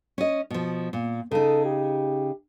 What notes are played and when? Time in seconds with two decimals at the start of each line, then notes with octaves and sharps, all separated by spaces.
0.18 C#4 D#5
0.50 B2 F3
0.93 A#2
1.31 C#3 D#4 A4
1.65 G4